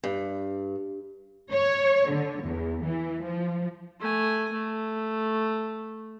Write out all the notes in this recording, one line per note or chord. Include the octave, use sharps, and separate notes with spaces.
G2
C#5
D3
E2
E3
F3
A3 G#5
A3